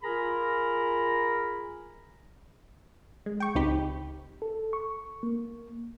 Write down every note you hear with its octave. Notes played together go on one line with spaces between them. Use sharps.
F4 G#4 A#4 A#5 B5
G#3
G5 C#6
C#2 C4 D#4 G4 B5
A4
C#6
A#3